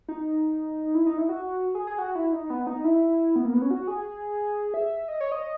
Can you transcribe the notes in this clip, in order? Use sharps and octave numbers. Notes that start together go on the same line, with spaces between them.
D#4
E4
D#4
E4
F#4
G#4
G#4
F#4
E4
D#4
B3
D#4
E4
B3
A#3
B3
C#4
F#4
G#4
E5
D#5
C#5
D#5